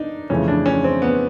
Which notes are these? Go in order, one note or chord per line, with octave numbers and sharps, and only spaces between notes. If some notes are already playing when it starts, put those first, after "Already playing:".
Already playing: D4 D#4
F2 C#3 E3 A3 C#4
D4
C#4
C4
B3